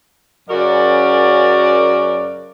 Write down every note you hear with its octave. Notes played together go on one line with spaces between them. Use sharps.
F#2 C#3 F#4 A#4 D5